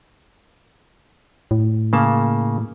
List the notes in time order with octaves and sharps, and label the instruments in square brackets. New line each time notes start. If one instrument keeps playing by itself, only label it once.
[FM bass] A2
[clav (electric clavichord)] C#3 A#3 A5